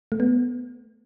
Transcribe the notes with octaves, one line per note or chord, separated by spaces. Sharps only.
A3
B3